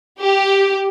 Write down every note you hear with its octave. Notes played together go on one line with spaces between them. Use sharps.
G4